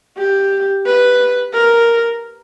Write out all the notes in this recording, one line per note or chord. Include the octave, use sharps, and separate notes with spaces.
G4
B4
A#4